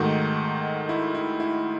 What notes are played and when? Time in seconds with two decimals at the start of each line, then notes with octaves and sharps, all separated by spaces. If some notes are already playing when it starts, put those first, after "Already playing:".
Already playing: G#2 D#3 A3 D#4 F#4
0.89 E4
1.15 E4
1.40 E4